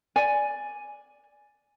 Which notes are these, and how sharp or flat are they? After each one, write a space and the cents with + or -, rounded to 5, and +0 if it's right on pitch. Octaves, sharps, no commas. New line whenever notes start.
D5 +0 G#5 +0